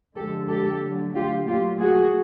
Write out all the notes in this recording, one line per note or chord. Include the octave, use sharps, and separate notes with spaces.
D3 F3 G#3 G4 A4
G4 A4
D3 F#3 A3
F4 G4
A#2 F#3 A3 F4 G4
F#4 G#4